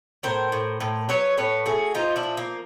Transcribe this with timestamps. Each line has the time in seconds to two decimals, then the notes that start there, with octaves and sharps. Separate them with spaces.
0.23 A2 A#4 C5
0.52 A2
0.80 A2
1.09 F#3 B4 C#5
1.37 A2 B4 C#5
1.66 A3 F#4 G#4
1.95 F3 D#4 F4
2.16 D4 E4
2.23 A#2
2.37 A#3